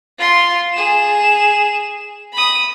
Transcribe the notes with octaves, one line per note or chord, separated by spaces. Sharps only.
F4 C6
G#4 E7
B5 D#6